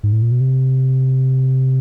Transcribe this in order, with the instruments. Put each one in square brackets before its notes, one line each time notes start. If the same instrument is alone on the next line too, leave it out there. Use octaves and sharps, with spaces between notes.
[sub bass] G#2
A2
A#2
B2
C3